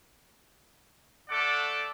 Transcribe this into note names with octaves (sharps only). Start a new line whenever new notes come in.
A3 A4 D5 F#5 D6